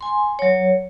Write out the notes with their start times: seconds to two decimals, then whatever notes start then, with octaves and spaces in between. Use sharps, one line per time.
0.01 G#5 C6
0.39 F#3 C#5